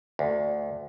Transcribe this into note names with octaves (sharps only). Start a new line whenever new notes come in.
D2